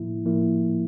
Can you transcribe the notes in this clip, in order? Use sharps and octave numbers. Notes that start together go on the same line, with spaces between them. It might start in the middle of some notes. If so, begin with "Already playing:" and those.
Already playing: A2 F3 A#3 E4
A2 F3 A#3 E4